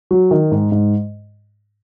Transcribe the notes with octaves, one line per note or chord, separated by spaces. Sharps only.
F#3
D#3
G#2
G#2